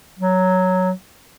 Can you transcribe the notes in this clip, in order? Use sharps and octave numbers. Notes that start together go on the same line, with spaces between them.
F#3